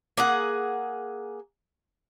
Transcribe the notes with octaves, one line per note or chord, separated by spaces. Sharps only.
A#3 G#4 F#5